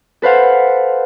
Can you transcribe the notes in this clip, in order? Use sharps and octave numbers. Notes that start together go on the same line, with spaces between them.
A4 B4 C5 F5 F#5